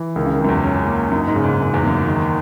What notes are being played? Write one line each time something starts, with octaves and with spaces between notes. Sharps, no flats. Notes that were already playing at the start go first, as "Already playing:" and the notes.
Already playing: E3
C#2 D#3
C#3
D#3
C#2 F#2
E2
C#4
A#3
F#2 D#4
G#2
C#3
G#2
F#2 C#3
E2
F#2 A#3
D#3